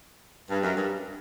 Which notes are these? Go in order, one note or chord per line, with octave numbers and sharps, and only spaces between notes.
G2
F#2
G2